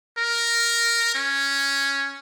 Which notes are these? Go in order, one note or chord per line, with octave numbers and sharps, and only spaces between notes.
A#4
C#4